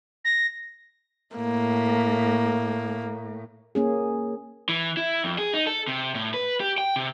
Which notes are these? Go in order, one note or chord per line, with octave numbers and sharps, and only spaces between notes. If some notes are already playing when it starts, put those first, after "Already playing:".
A#6
A2 A#3
A#3 C#4 G#4
E3
E4
F2
G#4
D#4
A4
C3
A2
B4
G4
G5
C3